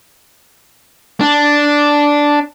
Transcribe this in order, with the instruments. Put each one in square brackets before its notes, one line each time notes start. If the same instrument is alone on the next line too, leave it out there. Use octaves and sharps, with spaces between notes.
[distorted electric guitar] D4